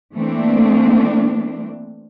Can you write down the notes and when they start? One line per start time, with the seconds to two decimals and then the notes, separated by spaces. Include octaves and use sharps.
0.14 E3 A3 A#3 C4 D4